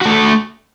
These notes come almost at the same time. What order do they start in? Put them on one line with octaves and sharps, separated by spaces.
F#4 A3 A4